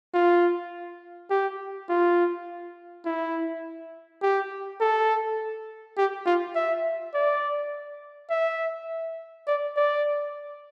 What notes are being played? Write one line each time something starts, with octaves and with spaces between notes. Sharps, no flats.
F4
G4
F4
E4
G4
A4
G4
F4
E5
D5
E5
D5
D5